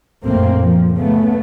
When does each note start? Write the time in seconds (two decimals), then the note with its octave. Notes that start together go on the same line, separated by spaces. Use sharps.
0.24 A#1 F#2 A3 A#3 C4
0.58 F3
0.95 C#3 A3 B3